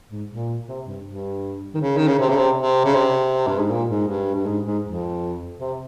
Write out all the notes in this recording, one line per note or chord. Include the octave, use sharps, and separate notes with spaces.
G#2
A#2
C3
G2
G2
D#3
C#3
D#3
C#3
C3
C#3
C3
C3
C#3
C3
G2
G#2
A#2
G#2
G2
G2
G#2
G#2
F2
C3